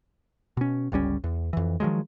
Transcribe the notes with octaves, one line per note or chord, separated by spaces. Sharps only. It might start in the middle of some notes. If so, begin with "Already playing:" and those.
B2 C#4
G1 C#2 G3 C#4
E2
F2 E3
D#3 F3 F#3 G#3